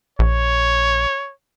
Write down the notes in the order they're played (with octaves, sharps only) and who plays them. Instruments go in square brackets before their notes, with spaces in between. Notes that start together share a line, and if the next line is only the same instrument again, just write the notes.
[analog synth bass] A#1 [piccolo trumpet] C#5